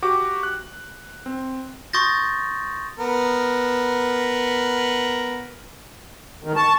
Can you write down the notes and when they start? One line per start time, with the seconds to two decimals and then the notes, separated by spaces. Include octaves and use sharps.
0.02 F#4 G4 D6
0.43 F#6
1.26 C4
1.93 C6 C#6 D#6 G6 A6 A#6
2.99 B3 A#4
6.44 D#3
6.56 A5 C#6